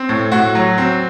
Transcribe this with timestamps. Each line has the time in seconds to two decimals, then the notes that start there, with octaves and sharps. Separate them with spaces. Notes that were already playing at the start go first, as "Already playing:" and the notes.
Already playing: C4
0.09 A2
0.32 A2 F#4
0.55 F#3
0.78 C4